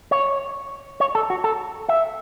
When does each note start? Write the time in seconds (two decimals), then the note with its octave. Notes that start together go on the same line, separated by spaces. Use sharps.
0.11 C#5
1.00 C#5
1.15 A4
1.30 F#4
1.44 A4
1.89 E5